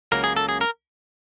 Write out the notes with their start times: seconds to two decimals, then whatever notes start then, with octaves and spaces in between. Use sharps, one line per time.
0.12 C#2 C#3 F#3 A#3 A#4
0.24 G#4
0.37 A4
0.49 G#4
0.61 A#4